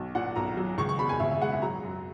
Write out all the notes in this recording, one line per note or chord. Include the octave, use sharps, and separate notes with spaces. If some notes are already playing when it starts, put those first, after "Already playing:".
Already playing: B1
A#2 F#5
B1 A#5
F#3
C#2 C#6
C#6
B2 B5
G#5
C#2 E5
E5
G#3 F#5
E5
F#3 A#5
F#2